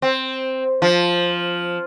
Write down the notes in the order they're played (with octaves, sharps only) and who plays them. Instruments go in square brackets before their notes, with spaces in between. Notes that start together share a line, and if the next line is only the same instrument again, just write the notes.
[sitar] C4
F3